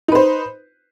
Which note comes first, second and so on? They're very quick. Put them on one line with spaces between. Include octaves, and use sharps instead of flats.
D#4 B4 C5